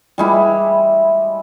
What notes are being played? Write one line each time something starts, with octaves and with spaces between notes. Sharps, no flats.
G3 G#3 E4